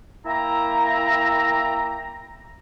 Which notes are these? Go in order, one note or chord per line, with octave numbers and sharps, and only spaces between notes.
A#3 E4 E5 G5 A#5